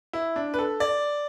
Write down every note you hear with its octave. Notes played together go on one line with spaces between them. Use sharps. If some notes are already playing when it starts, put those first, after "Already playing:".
E4
D4
B4
A4
D5